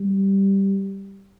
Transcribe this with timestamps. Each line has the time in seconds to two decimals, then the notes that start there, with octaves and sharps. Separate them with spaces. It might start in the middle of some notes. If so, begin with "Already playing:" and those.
Already playing: G3